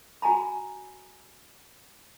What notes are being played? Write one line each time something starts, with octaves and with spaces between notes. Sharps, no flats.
F#4 G#5 A#5 B5